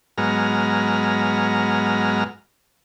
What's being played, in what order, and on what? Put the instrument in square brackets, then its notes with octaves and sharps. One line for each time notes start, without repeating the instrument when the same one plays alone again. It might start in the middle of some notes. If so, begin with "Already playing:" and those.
[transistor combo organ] G#2 F#3 G#3 B3 A#5 F6